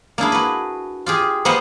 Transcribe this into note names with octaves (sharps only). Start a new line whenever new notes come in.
A#3 D4 E4 G#4
F#4 B4
F4 G4 G#4
A#3 B3 B4 C5 D#5 F#5